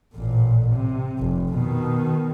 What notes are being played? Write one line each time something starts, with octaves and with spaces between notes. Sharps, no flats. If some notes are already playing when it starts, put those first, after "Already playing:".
A1 A#2
C3
F1
B2 D#3